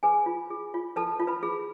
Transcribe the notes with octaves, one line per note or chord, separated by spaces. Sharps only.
G#4 B4 G#5
F4
G#4
F4
A4 B4 A5
F4
B4 B5
G#4